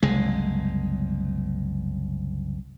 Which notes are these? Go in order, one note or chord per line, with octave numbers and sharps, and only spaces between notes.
F#1 C2 G#3